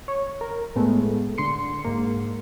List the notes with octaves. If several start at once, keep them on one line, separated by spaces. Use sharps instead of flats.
C#5
A#4
A2 G#3 A3 B3
D3 C6 C#7
G#2 A#3